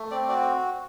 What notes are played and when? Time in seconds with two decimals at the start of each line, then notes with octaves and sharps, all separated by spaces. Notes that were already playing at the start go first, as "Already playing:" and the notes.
Already playing: A3
0.11 C4 D5
0.29 F#4 D5